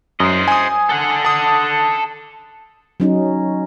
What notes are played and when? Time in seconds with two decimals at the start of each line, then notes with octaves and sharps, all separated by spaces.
0.20 F#2 C5 D#5
0.48 G#5 D#6
0.89 A4 F#5
1.25 A5 D#6
3.00 F#3 C#4 D#4